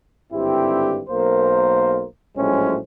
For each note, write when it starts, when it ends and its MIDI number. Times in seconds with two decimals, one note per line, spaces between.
0.32 1.03 32
0.32 1.03 43
0.32 1.03 50
0.32 1.03 60
0.32 1.03 64
0.32 1.03 67
1.09 2.05 35
1.09 2.05 58
1.09 2.05 70
1.09 2.05 72
2.37 2.78 34
2.37 2.78 45
2.37 2.78 54
2.37 2.78 56
2.37 2.78 61
2.37 2.78 72